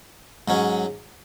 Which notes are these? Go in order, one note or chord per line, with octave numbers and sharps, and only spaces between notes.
G#2 F#3 C#4